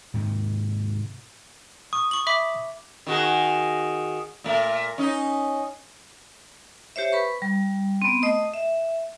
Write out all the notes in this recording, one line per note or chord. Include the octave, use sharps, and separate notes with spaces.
G#2 C3 D#3
C#6 D#6
C#6 F#7
E5 B5 D6
D#3 F#4 G#4
A#2 A3 A#4
C#4 D#4
G4 C5 C#5 E5
B4 B5 C#6
G3
B3 C4
A3 D#5 D#6
E5